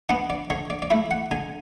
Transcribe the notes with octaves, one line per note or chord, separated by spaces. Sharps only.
B3 D4 F#5
D5
D3 C#5
D5
D5
A3 E4 E5
F#5
D3 G#5